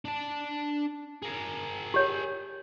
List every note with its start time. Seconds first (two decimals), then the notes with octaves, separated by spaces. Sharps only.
0.05 D4 A5
1.22 G#4 A#4
1.94 G4 C#5